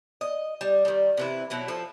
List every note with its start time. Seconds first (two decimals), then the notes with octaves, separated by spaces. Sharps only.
0.21 D#5
0.61 G3
0.85 D#3 G3
1.17 C3 E3 E4
1.50 B2 F#3 E4
1.68 F3 A4